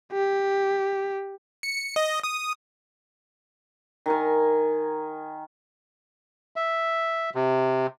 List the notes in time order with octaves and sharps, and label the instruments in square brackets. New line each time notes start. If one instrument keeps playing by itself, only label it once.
[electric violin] G4
[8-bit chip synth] C#7
D#5
D#6
[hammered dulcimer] D#3 A#4 G#5
[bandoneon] E5
C3